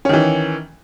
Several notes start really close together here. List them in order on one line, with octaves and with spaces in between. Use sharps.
C#4 D#3 E3